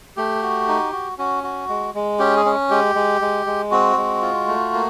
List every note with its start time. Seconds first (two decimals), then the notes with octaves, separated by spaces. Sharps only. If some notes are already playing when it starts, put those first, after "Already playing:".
0.17 A3 G4
0.42 F#4
0.68 D#4
0.93 F#4
1.18 C#4 F#4
1.43 F#4
1.69 G#3
1.95 G#3
2.19 C#4 G4
2.36 G#4
2.45 C#4
2.70 G#3 G4
2.95 G#3
3.21 G#3
3.46 G#3
3.71 C4 F#4
3.97 G#3
4.22 F4
4.48 A3
4.74 A#3